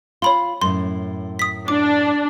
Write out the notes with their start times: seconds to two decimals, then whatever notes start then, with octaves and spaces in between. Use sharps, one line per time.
0.22 F4 C#5 B5 C6
0.62 F#2 A2 C6
1.39 D#6 B6
1.68 D4 D6